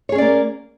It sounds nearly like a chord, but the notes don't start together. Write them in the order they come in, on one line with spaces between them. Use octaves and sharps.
C#5 G#4 C#4 D5 A#3